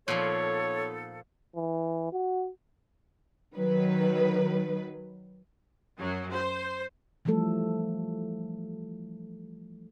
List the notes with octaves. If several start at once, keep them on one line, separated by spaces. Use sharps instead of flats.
A#2 F3 B3 D#4 A4 C#5
E3
F#4
D#3 F#3 B4
F#2 F#3
C5
E3 F3 G3 A3 A4